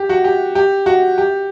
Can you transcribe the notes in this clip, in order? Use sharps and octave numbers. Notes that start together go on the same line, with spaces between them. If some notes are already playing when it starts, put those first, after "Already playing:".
Already playing: G4
F#4
G4
G4
F#4
G4